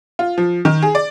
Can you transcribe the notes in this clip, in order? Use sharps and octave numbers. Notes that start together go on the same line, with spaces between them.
F4
F3
D#3
G#4
D5